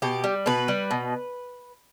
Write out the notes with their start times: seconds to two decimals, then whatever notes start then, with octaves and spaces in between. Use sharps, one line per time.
0.02 B2 G4
0.24 G3
0.46 B2 B4
0.68 G3
0.91 B2